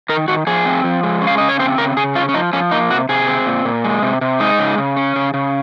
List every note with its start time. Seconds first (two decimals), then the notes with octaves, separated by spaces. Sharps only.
0.09 D#3 A#4
0.28 D#3 F#4
0.47 F3 G#4
0.66 C4
0.84 F3
1.03 G#3
1.22 C#4
1.27 F5
1.38 C#3 D#5
1.49 C#5
1.59 C4 C5
1.78 C#3 A#4
1.97 C#3 G#4
2.15 C#4 F4
2.29 C#4
2.34 F3 D#4
2.53 F3 C#4
2.72 A#3 D#4
2.90 C3 F#4
3.09 C3 G#4
3.28 C4
3.47 A#2
3.65 A#2
3.84 G#3
4.03 C3
4.21 C3
4.40 G#3 D#4
4.59 C#3
4.78 C#3
4.96 C#4
5.16 C#3
5.34 C#3